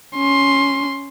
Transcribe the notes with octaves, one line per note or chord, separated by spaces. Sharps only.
C#4 C6